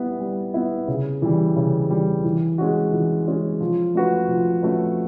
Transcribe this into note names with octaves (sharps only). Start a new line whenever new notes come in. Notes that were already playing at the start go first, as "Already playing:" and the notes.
Already playing: G3 B3 E4
G3
B3 E4
C#3
E3 G3
C#3
E3 G3
E3
G#3 C#4 F#4
E3
G#3 C#4 F#4
F3
A3 C#4 F#4 B4
F3
A3 C#4 F#4 B4